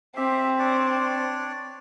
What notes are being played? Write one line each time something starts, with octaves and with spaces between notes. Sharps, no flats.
C4 G4 E5
D4 C#5 D5